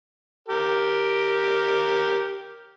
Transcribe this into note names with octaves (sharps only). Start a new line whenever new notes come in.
G4 A#4